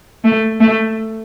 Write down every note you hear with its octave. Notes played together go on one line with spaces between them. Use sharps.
A3
A3